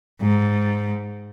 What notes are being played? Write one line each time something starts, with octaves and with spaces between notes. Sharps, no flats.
G#2